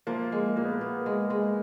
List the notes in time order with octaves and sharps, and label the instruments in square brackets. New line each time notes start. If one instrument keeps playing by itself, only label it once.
[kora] F3 [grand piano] A#3
[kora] G#3
[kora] A#2 [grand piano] A#3
[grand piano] B3
A#3
[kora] B3
G#3
G#3